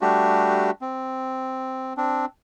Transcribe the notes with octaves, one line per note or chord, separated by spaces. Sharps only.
G3 A3 D4 F#4 G4
C4
C4 D4